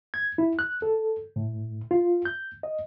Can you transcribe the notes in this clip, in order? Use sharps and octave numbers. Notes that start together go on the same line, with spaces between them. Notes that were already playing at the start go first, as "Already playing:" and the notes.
G#6
E4
F#6
A4
A2
F4
G6
D#5